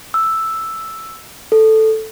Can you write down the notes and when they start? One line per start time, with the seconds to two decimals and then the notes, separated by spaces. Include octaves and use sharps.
0.14 E6
1.52 A4